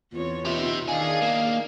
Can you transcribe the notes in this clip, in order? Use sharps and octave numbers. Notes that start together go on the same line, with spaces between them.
E2 C4 F4 C#5
B3 D#4 G4 E5
D#3 D4 D#4 G#4 F5 G#5
A#3